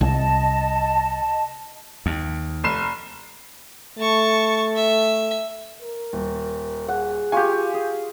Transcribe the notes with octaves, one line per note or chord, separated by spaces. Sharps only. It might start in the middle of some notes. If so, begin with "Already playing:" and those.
C2 D#5 A5
D#2
F1 C7 E7
A3 A5 C#6
E5
A#4
D#1
G#4 F#5
F4 G4 G#5 C#6
G#4